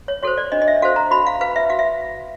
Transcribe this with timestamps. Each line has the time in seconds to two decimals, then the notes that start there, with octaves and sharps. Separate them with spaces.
0.08 C#5
0.23 F#4 A4 C5 C#5
0.38 D5
0.52 D4 D#5
0.62 D#5
0.68 E5
0.82 F#4 A4 C5 F5
0.96 A#5
1.11 F#4 B5
1.27 F5
1.41 B4 F5
1.56 E5
1.70 F#4 F5
1.79 E5